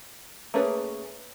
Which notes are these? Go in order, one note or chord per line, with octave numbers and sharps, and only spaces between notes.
A3 A#3 C#4 G#4 B4